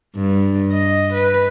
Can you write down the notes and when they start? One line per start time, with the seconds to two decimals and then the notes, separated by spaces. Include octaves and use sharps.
0.15 G2
0.72 D#5
1.14 B4